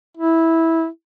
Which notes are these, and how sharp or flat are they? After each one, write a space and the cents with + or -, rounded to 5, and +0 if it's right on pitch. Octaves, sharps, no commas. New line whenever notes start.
E4 -10